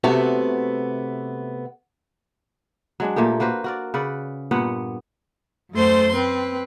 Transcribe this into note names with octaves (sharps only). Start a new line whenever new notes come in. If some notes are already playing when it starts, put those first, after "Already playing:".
C3 A3 B3 F#4
F#3 G#3 D4
A#2 A3 A#3 G4
A#3 F#4 B4 C5
F#4 A#4 D5
C#3 B4 D5 F#5
G2 A#2 B3 F#5
F#2 A3 C5 C6
C4 B4